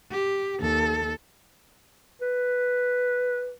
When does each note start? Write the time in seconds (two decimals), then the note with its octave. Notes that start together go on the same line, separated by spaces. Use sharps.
0.11 G4
0.60 D#2 A4
2.22 B4